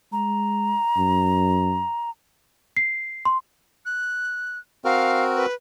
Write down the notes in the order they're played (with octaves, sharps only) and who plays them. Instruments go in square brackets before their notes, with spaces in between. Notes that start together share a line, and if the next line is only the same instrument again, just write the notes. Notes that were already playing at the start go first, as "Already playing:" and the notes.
[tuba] G#3 [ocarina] A#5
[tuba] F#2
[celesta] C7
C6
[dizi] F#6
[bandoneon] C4 F#4 A#4 [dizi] F5
[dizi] B4